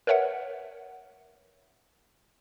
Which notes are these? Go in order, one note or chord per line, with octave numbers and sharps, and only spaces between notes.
A#4 B4 C#5 E5 F#5